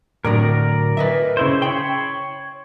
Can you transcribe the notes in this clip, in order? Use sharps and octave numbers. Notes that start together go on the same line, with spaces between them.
A2 D3 F#3 A#4 D5 A#5
B4 D#5 E5
C#3 E4 C5
C#5 G5 B5 C6